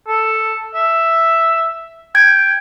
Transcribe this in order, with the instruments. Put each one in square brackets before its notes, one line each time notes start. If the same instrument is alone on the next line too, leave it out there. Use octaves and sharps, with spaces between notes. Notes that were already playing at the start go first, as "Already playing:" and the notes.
[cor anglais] A4
E5
[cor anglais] G5 [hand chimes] G#6